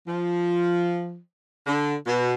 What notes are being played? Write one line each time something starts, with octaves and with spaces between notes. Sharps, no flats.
F3
D3
B2